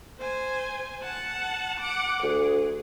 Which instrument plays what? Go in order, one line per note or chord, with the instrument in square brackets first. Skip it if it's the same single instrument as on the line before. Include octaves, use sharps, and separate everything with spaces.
[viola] C5 G#5
F#5 A5
F#5 D6
[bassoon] D2 [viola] G#4